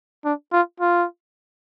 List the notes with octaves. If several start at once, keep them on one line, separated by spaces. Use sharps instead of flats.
D4
F4
F4